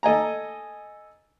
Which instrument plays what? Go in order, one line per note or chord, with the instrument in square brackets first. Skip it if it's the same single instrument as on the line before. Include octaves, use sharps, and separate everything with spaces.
[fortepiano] A4 D#5 G#5 A#5